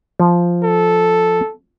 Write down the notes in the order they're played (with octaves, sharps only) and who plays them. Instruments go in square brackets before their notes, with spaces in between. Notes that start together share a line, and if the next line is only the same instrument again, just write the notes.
[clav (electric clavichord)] F3
[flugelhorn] A4